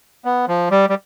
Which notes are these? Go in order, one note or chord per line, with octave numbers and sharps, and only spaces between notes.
B3
F3
G3
G3